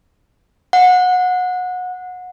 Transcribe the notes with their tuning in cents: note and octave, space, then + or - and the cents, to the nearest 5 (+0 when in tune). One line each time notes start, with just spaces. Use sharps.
F#5 -25